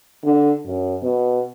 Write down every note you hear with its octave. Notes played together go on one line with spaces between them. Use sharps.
D3
F#2
B2